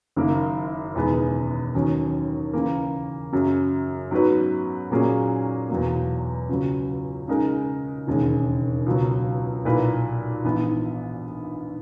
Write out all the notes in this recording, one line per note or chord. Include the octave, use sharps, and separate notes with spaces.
F#1 F#2 D#3 A#3
E1 E2 D#3 G#3 B3
D#2 D#3 F#3 C#4
C#3 E3 A#3
F#2 C#3 F#3
G#2 F#3 B3 F#4 B4
A#2 F#3 A#3 C#4 G#4
E2 B2 F#3 A#3
C#2 C#3 F#3
C#3 G#3 D#4 A#4
E1 D#2 C#3 G#3
C#2 B2 F#3
B1 A#2 A#3 E4 B4
A#1 G#2 E3 B3